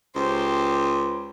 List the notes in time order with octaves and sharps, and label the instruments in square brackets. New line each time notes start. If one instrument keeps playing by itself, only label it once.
[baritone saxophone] C#2 [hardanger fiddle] G4 C5